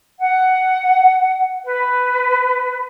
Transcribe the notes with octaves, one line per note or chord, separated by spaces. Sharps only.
F#5
B4